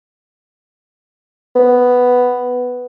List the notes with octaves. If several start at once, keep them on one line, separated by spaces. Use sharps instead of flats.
B3